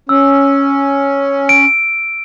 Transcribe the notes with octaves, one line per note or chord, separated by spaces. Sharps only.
C#4 E6
D7